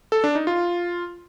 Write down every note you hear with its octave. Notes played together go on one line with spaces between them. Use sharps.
A4
D4
D#4
F4